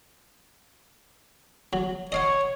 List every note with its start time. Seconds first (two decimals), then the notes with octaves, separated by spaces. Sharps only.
1.73 F#3
2.12 C#5 D#5 F5 F#5